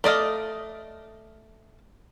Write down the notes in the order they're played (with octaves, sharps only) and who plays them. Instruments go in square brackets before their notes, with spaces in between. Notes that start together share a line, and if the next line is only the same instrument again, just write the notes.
[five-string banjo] A3 D5 D#5 F5